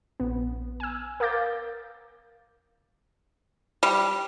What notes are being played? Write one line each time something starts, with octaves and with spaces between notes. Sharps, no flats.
A#1 B3
G#5 E6
A#4 F5 D6 G6 A6
G3